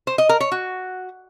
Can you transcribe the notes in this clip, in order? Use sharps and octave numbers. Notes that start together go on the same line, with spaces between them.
C5
D#5
A#4
C#5
F#4